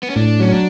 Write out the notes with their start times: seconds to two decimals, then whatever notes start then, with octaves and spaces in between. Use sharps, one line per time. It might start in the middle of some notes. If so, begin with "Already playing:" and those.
0.03 B3
0.10 C#4
0.16 A2 D4
0.40 F#3 C#4
0.52 D4